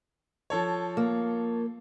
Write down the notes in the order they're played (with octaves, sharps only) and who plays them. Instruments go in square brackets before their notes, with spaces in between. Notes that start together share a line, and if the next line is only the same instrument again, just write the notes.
[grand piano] F3 A4 C#5
[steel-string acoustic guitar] A#3